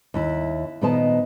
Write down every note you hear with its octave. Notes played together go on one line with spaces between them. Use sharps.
D#2 E4
A#2 D#3 B3 C5 D#5 A5